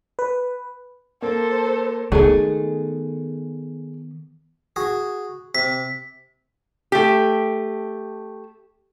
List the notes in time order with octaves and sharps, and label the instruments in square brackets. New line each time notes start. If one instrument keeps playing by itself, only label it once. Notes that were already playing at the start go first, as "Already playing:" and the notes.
[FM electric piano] B4
[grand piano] A#3 [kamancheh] A4 C5
[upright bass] D#3 B3 [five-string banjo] G#3 A3 G#4
[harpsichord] F#4 G#4
[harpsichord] C3 [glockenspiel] B6
[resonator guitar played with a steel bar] A3 G4